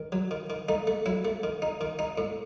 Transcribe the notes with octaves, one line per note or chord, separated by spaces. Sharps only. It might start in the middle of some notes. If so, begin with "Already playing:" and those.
Already playing: D#3
F#3
D#3
D#3
A3 D#4
A3
F#3 E4
A3
D#3
D#4
D#3
D#4
A2